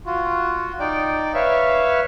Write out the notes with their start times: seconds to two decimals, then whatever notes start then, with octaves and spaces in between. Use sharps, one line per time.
0.06 F4 F#4
0.80 D#4 D5 G5
1.34 B4 C#5 E5 F5